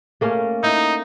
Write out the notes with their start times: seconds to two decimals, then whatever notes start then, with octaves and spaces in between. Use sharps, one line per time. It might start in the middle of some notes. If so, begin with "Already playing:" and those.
0.21 A3 A#3 C#4
0.63 D#4 E4